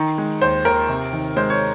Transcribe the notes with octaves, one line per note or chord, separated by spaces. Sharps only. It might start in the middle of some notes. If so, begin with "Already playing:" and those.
Already playing: D#3 A#5
G#3
D#2 C5
D#2 A#4
C3
D#3
G#3 C5
C#5